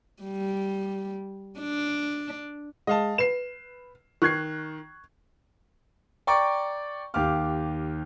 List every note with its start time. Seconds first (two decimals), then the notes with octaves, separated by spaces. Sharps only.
0.23 G3
1.60 D4
2.87 G#3 D#5 F5 A5
3.18 B4 C7 E7
4.22 D#3 C#6 F#6 G#6 C7
6.27 D5 G5 A#5 C#6 D6
7.14 D#2 G4 F5 D6 F6